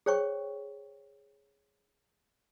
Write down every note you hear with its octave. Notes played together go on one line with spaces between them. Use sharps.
G#4 C5 C#5 G5 C#6